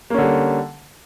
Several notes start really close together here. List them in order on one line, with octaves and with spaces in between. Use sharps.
A#3 C#4 D3 G3